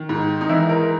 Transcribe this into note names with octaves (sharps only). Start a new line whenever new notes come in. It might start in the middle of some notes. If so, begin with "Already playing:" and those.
Already playing: D#3
G#2
D#4
E3 E4
A#4